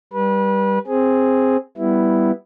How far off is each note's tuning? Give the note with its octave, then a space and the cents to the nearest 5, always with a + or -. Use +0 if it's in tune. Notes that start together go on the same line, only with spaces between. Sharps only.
G3 +0 B4 -30
C4 +0 G#4 +0
G3 +0 B3 +0 E4 +0